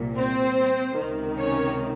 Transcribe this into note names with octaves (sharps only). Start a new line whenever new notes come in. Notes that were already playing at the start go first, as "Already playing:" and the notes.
Already playing: C2 A#2
C4 C5
C#2 C3 D#3
C#4 C#5